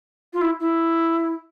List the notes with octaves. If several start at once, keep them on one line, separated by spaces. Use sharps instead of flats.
F4
E4
E4